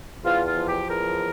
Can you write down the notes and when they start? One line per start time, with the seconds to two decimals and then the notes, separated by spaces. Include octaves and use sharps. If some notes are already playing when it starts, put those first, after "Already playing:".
0.25 E2 F4
0.46 F4
0.57 F3
0.68 G4
0.88 E2 A#4